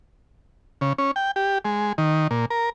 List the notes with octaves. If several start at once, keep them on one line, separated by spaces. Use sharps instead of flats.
C#3
C#4
G5
G4
G#3
D#3
A#2
A#4